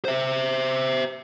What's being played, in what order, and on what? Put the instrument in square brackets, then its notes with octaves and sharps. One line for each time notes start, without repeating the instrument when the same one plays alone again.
[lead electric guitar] C5 E5